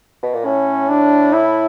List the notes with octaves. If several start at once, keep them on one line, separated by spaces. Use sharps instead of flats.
B2
A#2
A2 C#4
D4
E4